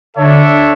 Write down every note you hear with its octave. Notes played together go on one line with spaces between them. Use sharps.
D3 D4 A4 C#5 E5